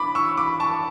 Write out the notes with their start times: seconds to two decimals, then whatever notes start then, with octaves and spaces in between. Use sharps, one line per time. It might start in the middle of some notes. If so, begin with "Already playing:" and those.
Already playing: E3 D4 B5 D6
0.15 C#6 E6
0.37 B5 D6
0.60 A5 C#6